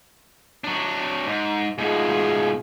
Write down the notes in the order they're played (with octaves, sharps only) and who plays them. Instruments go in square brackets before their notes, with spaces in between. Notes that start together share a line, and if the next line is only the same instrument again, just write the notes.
[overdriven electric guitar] F#3 D4
G#2
[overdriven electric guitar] G#2 B2 [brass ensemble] A3 F4 G#4